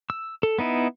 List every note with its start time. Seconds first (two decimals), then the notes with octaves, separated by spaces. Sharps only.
0.10 E6
0.43 A4
0.59 B3 D#4 E4